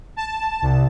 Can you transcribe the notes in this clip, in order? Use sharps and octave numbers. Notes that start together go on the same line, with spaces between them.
A5
C2